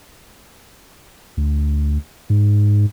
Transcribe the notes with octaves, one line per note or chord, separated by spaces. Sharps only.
D2
G#2